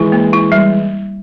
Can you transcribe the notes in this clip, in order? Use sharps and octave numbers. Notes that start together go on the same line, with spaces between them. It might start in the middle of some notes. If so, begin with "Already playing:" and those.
Already playing: E3 G#3 E4
A#3
E4
G3